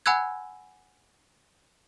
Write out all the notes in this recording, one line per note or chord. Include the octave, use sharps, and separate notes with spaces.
F#5 G#5 B5 E6 F#6 G#6